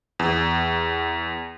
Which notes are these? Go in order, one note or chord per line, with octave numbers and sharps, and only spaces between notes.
E2